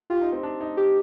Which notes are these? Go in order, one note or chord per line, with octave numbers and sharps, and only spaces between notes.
F4 G4
D#4
C4
D4
D#4
G4